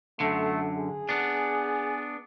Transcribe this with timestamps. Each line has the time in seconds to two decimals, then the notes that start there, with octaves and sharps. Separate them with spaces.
0.20 F#2 D3 A3
0.75 G#4
1.09 B3 D4